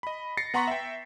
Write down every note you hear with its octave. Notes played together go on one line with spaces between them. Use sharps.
D#5 B5
A6 A#6 C7 C#7
B3 F#5 A#5 C6 C#6 B6
E5 G5